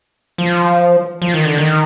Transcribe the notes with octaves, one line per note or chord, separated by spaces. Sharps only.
F3
F3
D#3
D3
D#3